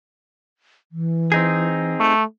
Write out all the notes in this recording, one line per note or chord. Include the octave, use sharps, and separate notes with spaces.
E3
C4 D#4 G#4
A3